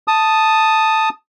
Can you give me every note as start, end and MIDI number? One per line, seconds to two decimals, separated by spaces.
0.08 1.09 81
0.08 1.09 87